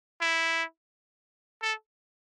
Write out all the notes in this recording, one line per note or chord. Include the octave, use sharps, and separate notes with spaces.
E4
A4